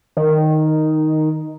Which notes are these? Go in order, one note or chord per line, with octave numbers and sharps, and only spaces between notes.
D#3